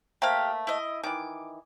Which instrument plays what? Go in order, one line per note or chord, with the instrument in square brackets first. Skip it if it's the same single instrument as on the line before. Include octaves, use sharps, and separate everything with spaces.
[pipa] A3 A#3 C5 [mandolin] G4 F5
[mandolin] E4 D#5
[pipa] D#3 E3 [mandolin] D6